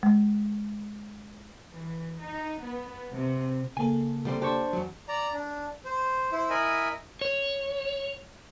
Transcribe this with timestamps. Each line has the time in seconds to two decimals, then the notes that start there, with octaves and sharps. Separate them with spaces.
0.03 G#3
1.71 E3
2.21 D#4
2.62 B3
3.11 C3
3.77 C#3 A#3 A4 G#5
4.25 C2 G3 C4
4.42 D4 G4 C5 C#6
4.73 E2 F#3
5.09 D5 A#5
5.33 D4
5.85 C5
6.32 E4 C5
6.50 E4 A#4 D#5 G#5 B5
7.21 C#5